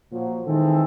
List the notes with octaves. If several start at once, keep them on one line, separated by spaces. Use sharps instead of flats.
A#2 F3 F#3
D#3 E3 G#3 C4 A4